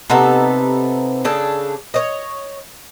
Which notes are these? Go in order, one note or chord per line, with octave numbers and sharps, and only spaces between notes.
C3 B3 D#4 A4
C#3 D4 G#4 A4
C#5 D#5